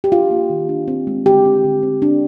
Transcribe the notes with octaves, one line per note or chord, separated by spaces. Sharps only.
G4
D4 F4
A#3
D#3
D4
C4
G#3
D3 G4
C4
D3
C4
D4